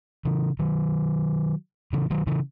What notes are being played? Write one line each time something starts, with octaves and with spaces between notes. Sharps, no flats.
C#3 E3
D#3 F#3
C#3 E3
D#3 F#3
C#3 E3